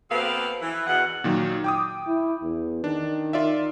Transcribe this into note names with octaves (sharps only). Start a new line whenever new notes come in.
B2 A#3 C4 A4 B4 F5
E3
E2 B2 F#5
A#2 D#3 F#3
G5 D6 D#6
E4
E2
D#3 D4
F4 D5 E5